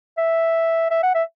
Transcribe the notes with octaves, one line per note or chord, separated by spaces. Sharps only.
E5
E5
F#5
E5